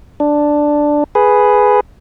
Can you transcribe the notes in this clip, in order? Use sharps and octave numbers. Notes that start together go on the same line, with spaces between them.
D4
G#4 B4